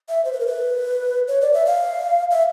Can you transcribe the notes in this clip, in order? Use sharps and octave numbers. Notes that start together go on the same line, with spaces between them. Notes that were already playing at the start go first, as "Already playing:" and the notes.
E5
C5
B4
A#4
B4
C#5
D5
E5
F5
E5